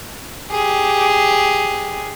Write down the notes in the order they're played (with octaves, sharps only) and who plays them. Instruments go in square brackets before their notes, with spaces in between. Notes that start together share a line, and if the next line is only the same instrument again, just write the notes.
[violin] G4 G#4